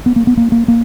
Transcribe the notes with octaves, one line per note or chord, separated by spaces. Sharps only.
B3
A#3
B3
A#3
A#3
A#3